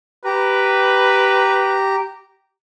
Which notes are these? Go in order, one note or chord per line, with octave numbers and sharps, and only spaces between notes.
G4 B4 A#5